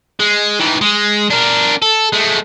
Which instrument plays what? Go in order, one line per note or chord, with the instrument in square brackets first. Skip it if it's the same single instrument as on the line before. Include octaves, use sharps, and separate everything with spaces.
[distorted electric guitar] G#3
D#3 E3
G#3
D4 A#4
A4
G#3 A3